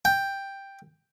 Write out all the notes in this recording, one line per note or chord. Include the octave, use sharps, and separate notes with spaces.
G5